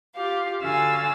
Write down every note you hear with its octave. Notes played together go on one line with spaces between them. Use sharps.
F4 G4 F5
D3 F#4 F5 G#5 E6 A6